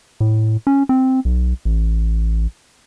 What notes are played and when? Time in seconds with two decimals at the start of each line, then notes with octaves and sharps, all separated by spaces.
0.20 A2
0.67 C#4
0.89 C4
1.25 B1
1.65 A1